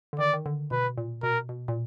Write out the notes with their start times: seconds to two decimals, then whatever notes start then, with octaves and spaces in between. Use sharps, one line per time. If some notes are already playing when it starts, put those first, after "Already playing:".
0.13 D3
0.19 D#3 D5
0.33 D#3
0.46 D3
0.71 B2 B4
0.98 A#2
1.23 B2 A#4
1.49 B2
1.68 A#2